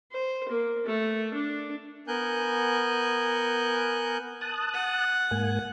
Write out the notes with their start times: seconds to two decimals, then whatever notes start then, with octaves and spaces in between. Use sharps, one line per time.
0.12 C5
0.49 A#3
0.86 A3
1.34 D4
2.08 B3 A#4 G#5 F#6 G6
4.41 A5 D#6 F#6
4.74 F#5
5.31 G#2 A#3 G#5